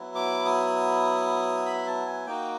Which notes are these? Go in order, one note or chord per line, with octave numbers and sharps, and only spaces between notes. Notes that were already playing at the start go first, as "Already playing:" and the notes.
Already playing: F#3 B3 E4
D6
D#6
B5
A5
G#5
A#3 D#4 F#4 G5